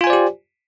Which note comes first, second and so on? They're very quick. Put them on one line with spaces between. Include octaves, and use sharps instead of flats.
F4 G#5 C5 D5 G4